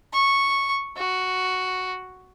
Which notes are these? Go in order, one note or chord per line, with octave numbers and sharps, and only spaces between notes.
C#6
F#4